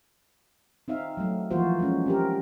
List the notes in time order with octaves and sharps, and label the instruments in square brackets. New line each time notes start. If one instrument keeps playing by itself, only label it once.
[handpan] C4 D#4 E5 F5
F#3 A3
E3 F3 A#3 F4 F#4 C5
G#3 C#4
C4 G4 A#4